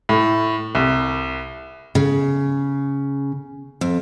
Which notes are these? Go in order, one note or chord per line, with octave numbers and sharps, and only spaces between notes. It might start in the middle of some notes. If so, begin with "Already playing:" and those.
A2
C2
C#3
F2